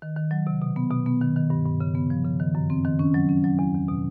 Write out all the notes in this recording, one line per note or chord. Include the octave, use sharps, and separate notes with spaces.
D#3
D#3
F#3
C3
B2
B3
B2
B3
D#3
D#3
G2
G2
C#3
B3
F3
C#3
D#3
F#2
C4
D#3
C#4
F#3
C#4
F#3
E2
E2
B2